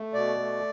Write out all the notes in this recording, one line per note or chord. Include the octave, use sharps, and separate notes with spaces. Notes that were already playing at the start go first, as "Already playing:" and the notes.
Already playing: A3
B2 D5
A3